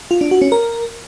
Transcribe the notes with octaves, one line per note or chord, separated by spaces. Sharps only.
F4
D4
F#4
C#4
A#4